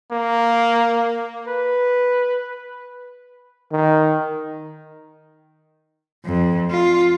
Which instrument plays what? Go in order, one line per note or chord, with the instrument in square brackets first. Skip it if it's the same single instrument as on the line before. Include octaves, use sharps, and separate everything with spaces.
[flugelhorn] A#3
B4
[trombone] D#3
[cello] F2
F4